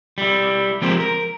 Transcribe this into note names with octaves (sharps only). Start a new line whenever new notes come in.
G3 E4
F3 G#3 C4 G4 A#4 C5
A#4